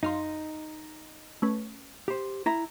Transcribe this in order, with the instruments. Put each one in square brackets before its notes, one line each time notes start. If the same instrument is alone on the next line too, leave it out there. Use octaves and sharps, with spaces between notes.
[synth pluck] F#2 F5 C6 [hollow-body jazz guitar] D#4
[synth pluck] A3 C#4 B4
[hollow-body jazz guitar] G4 C5
E4 A#5